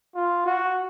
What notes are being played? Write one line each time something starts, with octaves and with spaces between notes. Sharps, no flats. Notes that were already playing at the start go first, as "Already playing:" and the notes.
F4
F#4